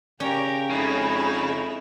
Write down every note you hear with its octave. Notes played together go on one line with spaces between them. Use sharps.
C#3 C#4 G4 A#4 G5
F2 C#3 G#3 D#4 E4